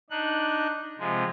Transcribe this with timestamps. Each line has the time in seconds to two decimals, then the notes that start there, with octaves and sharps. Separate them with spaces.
0.10 D4 D#4 F#6
0.99 C3 F3 G#3